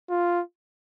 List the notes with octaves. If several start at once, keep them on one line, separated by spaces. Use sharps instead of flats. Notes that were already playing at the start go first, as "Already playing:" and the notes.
F4